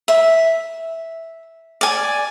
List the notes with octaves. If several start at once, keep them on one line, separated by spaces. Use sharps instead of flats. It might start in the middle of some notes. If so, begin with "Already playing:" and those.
E5
D5 G#5